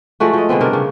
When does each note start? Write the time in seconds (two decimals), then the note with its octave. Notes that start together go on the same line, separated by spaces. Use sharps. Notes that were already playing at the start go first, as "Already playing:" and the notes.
0.20 F3 G#3 A3 F#4
0.33 F3 D#5
0.49 D3 G#3 B3 C4
0.61 G2 C3 D4 A#4
0.73 C#3